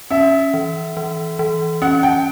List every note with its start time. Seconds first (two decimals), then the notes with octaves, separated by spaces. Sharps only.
0.11 C#4 E5
0.54 E3
0.97 E3
1.39 E3
1.82 C#4 F#5
2.03 G5